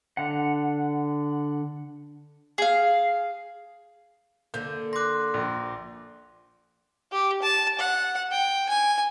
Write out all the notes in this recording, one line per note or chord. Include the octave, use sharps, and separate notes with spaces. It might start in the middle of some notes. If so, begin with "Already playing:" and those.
D3 F#5
G#4 F5
D3 A#3 G6
C6 D6 F#6 A#6
A#1
G4
A5
F#5
G5
G#5